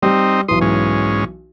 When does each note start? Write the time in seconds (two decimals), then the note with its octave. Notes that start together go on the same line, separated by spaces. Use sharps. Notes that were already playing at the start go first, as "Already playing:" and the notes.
0.02 G3 C4 D#4
0.48 B1 E3 C6 D#6
0.61 G#2 C#4